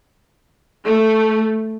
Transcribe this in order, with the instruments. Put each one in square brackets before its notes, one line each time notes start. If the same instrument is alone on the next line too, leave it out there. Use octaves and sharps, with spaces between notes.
[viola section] A3